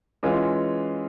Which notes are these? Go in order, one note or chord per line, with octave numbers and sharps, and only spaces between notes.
E3 G#3 C#4 F4